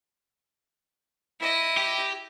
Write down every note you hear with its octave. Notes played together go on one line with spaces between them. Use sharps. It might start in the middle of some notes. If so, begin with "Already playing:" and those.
E4 D#5
G4